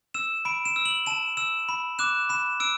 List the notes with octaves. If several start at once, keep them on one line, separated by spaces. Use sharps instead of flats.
E6 E7
B5 D7
E7
E6
F#7
A5 E7
E6 E7
B5
D6 F#6 E7
B5 E7
E6 D7